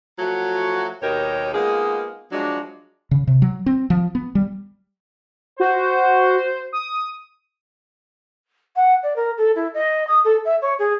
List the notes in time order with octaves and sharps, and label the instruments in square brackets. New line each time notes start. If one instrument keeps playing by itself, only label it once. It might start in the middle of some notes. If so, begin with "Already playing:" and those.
[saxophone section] F3 F#3 A3 F#4
D#2 B2 D#4 G4 A#4 C#5
G#3 A#3 B3 D#4 F4 G#4
F3 F#3 G#3 D4
[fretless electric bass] C#3
C3
F#3
C4
F3
B3
G3
[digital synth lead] F#4 [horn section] C5
[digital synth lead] D#6
[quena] F#5
D5
A#4
A4
E4
D#5
D#6
A4
E5
C#5
G#4